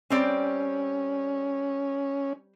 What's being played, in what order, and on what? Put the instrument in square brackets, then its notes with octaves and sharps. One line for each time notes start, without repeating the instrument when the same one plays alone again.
[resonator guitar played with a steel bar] G3 C4 D5 [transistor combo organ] C#4